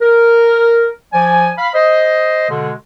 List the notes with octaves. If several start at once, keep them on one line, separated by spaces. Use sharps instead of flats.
A#4
F3 D5 G#5
F5 B5
C5 D#5
B2 D3 G#3